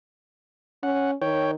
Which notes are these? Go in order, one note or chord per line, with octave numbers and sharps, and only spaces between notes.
C#4 F#5
D#3 C#5 G5